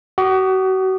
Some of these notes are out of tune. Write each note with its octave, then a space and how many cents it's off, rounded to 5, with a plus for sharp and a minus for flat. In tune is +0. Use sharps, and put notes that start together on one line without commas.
F#4 +35 D#6 -30